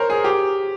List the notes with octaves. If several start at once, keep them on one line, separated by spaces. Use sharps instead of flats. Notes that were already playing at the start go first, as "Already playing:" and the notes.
Already playing: A#4 C5 C#5
G#4
G4